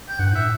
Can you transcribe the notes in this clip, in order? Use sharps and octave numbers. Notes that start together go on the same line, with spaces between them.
G5
G2 F#5
A2 E5